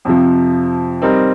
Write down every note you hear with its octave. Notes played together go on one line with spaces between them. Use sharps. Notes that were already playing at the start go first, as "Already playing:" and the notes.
F2 C3 F3
G3 C4 D#4 A#4